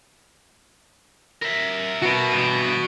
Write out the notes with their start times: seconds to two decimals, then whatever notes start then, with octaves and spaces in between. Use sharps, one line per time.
1.43 A#4 E5
2.02 F#4 B4
2.33 G2 E3